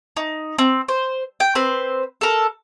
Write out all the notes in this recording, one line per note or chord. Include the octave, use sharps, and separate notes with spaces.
D#4
C4
C5
G5
C4 B4 C5
A4 A#4